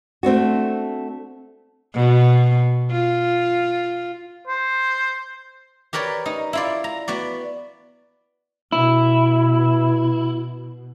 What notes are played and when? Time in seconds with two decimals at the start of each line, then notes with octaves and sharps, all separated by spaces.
0.23 A3 C4 D4 F#4
1.94 B2
2.92 F4
4.48 C5
5.93 G4 A#4 B4 C#5 D5
6.26 D#4
6.53 E4 F4 D5
6.84 A#5
7.08 B3 F#4 D5
8.72 B2 E4